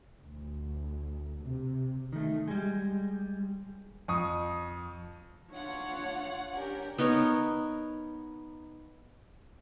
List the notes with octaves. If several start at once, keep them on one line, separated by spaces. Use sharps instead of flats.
D2
C3
D#3 A3
G3 G#3
F2 C#6 D#6
D4 F4 C#5 F#5
C#4 D4 G4 A#4
B3 D#4 A#4 C#5